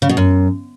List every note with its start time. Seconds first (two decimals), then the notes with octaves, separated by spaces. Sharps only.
0.02 C#3
0.09 B2
0.17 F#2